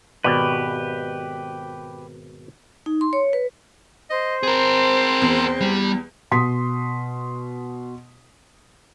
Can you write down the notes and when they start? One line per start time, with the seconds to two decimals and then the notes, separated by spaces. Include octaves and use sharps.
0.24 G#1 B2 G4 B4 D5
2.86 D#4
3.01 C6
3.13 C#5
3.33 B4
4.10 C5 D#5
4.43 C4 G#4 A#4
5.22 E2
5.61 G3
6.31 B2 C6 D#6 B6